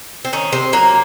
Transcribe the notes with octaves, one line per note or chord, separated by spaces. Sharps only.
C4
D#3 C#4
C3 C4
F#3 A#3